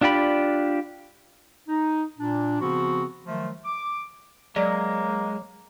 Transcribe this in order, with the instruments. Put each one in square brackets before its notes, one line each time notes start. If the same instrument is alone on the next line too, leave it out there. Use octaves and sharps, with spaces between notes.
[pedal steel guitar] D4 F4 G4 D5 B5
[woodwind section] D#4
A#2 D4
C#3 F3 B3 C4 F#4
D#3 F3 F#3 A3
D6
[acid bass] F#3 [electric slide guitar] G#3 [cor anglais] A#3 [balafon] D5